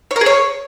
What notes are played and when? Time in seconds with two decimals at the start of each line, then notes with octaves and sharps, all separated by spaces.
0.11 C#5
0.16 A#4
0.21 G#4
0.26 C#5